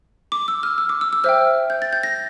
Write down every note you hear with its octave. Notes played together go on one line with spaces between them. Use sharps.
D6
E6
F6
E6
D6
E6
E6
C5 E5 G5 F6
G6
A6
G6
A#6